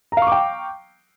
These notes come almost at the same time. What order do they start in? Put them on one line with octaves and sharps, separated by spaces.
A#5 F5 C#6 D6 G5